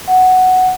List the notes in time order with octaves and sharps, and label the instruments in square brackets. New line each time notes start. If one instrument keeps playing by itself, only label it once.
[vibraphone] F#5